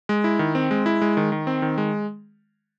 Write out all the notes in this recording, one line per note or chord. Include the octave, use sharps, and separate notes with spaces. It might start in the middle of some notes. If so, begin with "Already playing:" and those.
G#3
E4
D#3
C4
G#3
E4
G#3
D#3
D#3
C4
D#3
G#3